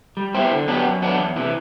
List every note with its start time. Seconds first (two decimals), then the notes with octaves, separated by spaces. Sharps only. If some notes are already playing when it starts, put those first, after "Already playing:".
0.17 G3
0.35 B3 E4 G4 C5
0.51 D3
0.68 F#3 B3 D4 G4
0.85 F#2
1.02 F#3 B3 D4
1.19 E2
1.36 C3 E3